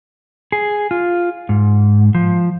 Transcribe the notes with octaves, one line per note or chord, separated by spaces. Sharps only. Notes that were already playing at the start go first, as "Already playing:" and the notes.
G#4
F4
G#2
F3